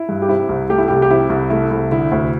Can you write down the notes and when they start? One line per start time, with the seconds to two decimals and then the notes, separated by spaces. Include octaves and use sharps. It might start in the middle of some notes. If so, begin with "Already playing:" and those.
Already playing: E4
0.09 G2
0.22 G4
0.29 C3 E4
0.49 C2
0.69 A3 G4
0.78 E4
0.88 C2 G4
1.02 G4
1.10 C3 E4
1.30 C2
1.50 A3 E4
1.71 C2
1.91 D3 E4
2.12 D2